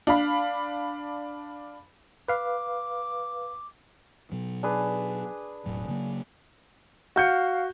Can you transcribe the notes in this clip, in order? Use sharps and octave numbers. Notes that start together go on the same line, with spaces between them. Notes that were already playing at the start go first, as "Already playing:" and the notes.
D4 F5 B5
B4 F5 D6
B2 F#3
D4 G#4 B4
E1 A2 F#3
C#3 F#3 A#3
F#4 F5 G6 C#7